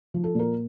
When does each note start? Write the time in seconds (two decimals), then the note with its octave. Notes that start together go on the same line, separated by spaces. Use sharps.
0.14 F3
0.24 A4
0.35 A#2 A#4